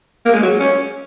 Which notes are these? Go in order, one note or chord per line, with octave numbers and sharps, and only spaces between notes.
A#3
G#3
F#3
C#4